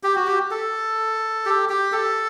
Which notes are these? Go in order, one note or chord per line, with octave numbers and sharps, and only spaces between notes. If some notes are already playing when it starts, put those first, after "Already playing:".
G4
F#4
G4
A4
G4
G4
A4